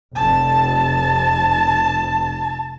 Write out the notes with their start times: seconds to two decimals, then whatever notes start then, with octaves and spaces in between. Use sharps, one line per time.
0.15 F1 A5